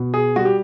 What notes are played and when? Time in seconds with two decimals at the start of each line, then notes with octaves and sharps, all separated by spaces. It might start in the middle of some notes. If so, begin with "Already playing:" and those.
Already playing: B2
0.14 G#4
0.36 G3 F#4
0.45 G4